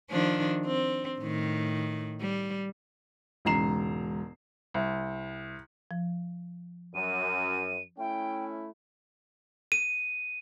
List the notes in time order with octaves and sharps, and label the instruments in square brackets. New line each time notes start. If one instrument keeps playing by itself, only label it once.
[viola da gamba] D#3 F3 D4
C4
A2 D#3
G3
[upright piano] E1 G#2 C#3 A#5 C7 E7
C2
[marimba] F3
[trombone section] F#2 [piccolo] D#7
[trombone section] A3 C#4 E4 [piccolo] G5
[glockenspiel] D#7